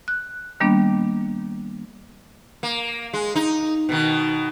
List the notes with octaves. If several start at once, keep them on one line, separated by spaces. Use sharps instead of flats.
F#6
D#3 G3 A#3 B3 D4
A#3
G#3
D#4
B2 D#3